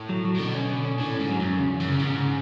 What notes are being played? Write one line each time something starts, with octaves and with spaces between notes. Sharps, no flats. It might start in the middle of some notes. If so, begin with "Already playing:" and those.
Already playing: A2
F#3
F#3
A2
B2 D3
C#4
D3
C#4
A2 D3
G#2 C#4
F#3
F#2
C#4
E2 C#3
C#3
F#2
C#3
G#2 C#3
C#3